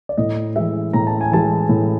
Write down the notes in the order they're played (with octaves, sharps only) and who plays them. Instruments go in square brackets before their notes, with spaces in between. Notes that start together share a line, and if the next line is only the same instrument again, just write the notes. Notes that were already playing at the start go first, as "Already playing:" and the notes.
[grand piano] D5
A2 D#5
E3 G#3 E5
A2 A#5
A5
G#5
E3 G#3 A5
A2